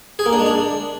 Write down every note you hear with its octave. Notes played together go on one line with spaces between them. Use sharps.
G#4
A#3
D4
G#3
D4